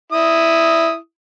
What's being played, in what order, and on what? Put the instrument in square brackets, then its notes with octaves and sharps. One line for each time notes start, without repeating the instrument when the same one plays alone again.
[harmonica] E4 D#6